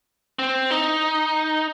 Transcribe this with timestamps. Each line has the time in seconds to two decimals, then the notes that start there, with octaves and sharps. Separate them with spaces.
0.39 C4
0.71 D#4